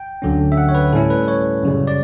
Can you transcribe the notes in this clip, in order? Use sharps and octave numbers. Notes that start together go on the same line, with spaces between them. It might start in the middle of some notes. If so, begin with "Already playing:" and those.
Already playing: G5
D2 D3 F#3 C#4
E5
F#5
C#5
B4
A2 G3 C#4 E4 A4
B4
C#5
F#2 C#3 G3
D5